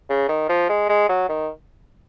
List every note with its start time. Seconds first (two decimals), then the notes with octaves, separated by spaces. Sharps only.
0.10 C#3
0.29 D#3
0.49 F3
0.69 G#3
0.89 G#3
1.09 F#3
1.29 D#3